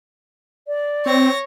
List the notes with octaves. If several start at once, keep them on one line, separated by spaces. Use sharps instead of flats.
D5
C4 C#5 A#6